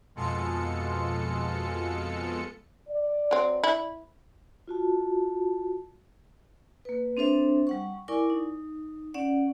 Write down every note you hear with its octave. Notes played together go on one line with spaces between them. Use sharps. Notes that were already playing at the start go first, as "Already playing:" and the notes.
F2 B2 G#3 F4 A4 C#7
D5
F#3 C4
E4
F4 F#4 A5
A#3 B4
C4 D4 A4 C5 E5
G3 F#5 C#6
E4 A#4 D5 G#5 C#6 D6
D#4
C#4 D5 F#5